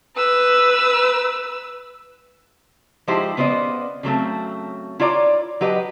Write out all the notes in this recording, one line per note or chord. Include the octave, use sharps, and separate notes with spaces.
B4 E6
F3 G#3 D#4 E4 G4 C5
C#3 B3 C5 D5 D#5
C#3 F#3 A3 C4
E4 F4 C#5 D5 A#5
F#3 G4 B4 D#5